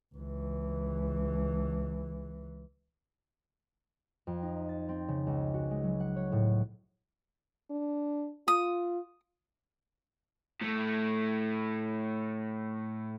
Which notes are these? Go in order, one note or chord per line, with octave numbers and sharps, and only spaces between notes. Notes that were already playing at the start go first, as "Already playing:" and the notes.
C#2 E3
F2
D#4
A6
C4
C#3
C#2
F#4
G#3
F#3
F#5
C#5
A2
D4
F4 D#6
A2 A3